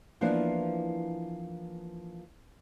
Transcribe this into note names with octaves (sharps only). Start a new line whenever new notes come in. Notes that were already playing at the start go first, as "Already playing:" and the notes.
E3 F3 A#3 B3 D4 E4